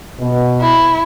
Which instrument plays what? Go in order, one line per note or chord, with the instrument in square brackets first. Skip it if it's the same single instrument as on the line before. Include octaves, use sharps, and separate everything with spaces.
[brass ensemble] B2
[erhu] E4